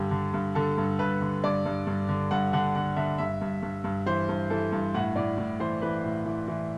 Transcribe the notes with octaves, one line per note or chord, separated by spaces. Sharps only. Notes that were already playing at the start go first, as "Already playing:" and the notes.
Already playing: G2 D3 G4
D3
G2
D3 A4
G2
G2 B4
D3
G2 D5
G2
G2
D3
G2 F#5
D3 F#5
D3 F#5
D3 E5
G2 E5
G2
G2
G2
E3 C5
G2
E3 A4
G2
A2 F#5
A2 D5
A2
E3 C5
E3 B4
A2
E3
E3